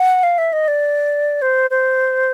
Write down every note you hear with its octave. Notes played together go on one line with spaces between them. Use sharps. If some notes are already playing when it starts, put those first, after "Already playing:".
Already playing: F#5
F5
E5
D#5
D5
C5
C5